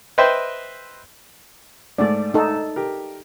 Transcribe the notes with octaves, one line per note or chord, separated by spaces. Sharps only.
B4 C5 D#5 E5 G5 C6
G#2 A3 D5
D#4 A4
G4 A#4